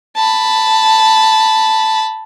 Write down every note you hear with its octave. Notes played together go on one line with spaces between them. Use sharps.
A5 B5